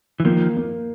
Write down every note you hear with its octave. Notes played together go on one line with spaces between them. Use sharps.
E3
D#3 F3 A#3
A#3